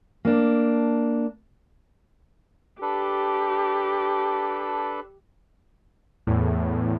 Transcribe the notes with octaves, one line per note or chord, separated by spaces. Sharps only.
A#3 D4
D4 G4 A4 B4
E2 A2